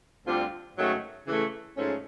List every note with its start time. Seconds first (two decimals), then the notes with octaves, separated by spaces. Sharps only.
0.26 D2 D3 G3 C4 F4
0.76 G#2 D#3 F#3 A3 C#4
1.26 C#3 E3 A3
1.76 G#2 F3 A3 C#4